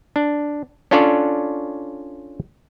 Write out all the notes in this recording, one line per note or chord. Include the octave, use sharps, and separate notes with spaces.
D4
C#4 D4 F4 A4 C#5 D5